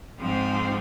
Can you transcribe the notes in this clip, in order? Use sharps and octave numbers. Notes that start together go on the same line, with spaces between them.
G#2 F3 C4